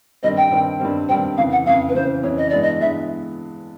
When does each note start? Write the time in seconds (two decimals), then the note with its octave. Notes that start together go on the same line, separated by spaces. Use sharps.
0.23 G2 D#3 G3 C4 D#5
0.37 G5
0.51 G2 D#3 G3 C4
0.80 G2 D#3 G3 C4
1.09 G2 D#3 G3 C4 G5
1.37 F2 C#3 E3 F5
1.52 F#5
1.66 F2 C#3 E3 F5
1.89 B4
1.95 F2 C#3 E3 C5
2.23 F2 C#3 E3 C#5
2.38 D#5
2.50 G2 E3 G#3 B3 D5
2.62 D#5
2.80 G2 E3 G#3 B3 E5